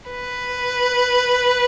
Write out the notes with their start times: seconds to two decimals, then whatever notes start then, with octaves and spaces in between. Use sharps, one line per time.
0.10 B4